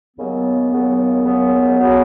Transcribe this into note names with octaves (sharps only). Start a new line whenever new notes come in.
D#2 C#3 F#3 B3
D#2 C#3 F#3 B3
D#2 C#3 F#3 B3
C#3 F#3 B3